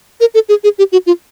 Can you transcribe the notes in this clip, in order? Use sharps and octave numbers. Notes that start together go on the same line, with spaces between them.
A#4
A4
G#4
G#4
G4
F#4
F4